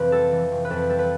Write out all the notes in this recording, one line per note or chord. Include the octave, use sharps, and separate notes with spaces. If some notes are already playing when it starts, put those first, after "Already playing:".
Already playing: F1 F2 E3 B4
G3 A4
E3
F1
B4
F2 A4
G3 A4
B4